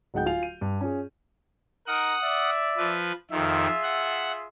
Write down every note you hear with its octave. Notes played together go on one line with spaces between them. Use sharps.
D1 G#3 D#4 F#5 G5 G6
F4 F5 G#5 F7
D#7
G2
C#4 F4 G#4
D#4 A#4 F#5 D#6
D5 E5
F3 B4
F2 D#3 F4 G#4 E5
F#5